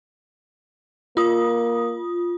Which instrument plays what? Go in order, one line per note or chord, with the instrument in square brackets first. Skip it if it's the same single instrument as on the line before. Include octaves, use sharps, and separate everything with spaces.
[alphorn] A#3 [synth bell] F4 D#6